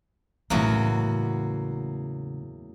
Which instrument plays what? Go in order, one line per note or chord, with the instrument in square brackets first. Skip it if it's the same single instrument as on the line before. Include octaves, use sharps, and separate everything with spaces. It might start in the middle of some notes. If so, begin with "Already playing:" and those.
[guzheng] E2 F#3 A#3 [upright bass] A2 C#3